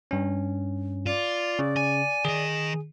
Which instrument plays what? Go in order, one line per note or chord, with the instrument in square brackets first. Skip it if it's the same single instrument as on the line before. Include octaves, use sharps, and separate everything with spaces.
[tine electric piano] G2 C#4
[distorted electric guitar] F4 [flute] D5
[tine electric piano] C#3
[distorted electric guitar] G#5
[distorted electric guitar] D#3 D#5 [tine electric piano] G#4